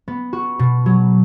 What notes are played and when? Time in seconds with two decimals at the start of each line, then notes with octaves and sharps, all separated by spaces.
0.08 B3
0.33 F#4
0.59 B2
0.86 F#3